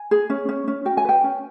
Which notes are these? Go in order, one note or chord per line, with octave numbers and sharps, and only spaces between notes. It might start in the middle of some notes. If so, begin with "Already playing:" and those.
Already playing: G#5
G#4
C#4
C#4
C#4
F#4 G5
G#5
B4 G5
C#4